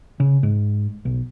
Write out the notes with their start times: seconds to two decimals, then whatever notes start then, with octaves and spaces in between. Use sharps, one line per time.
0.20 C#3
0.43 G#2
1.05 B1